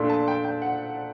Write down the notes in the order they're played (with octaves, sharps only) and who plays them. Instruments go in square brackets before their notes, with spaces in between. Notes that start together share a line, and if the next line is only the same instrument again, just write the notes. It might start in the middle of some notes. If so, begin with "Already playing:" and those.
Already playing: [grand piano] A#2 A3 D4 A4 [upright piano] C6
[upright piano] A5
G5
G5
F#5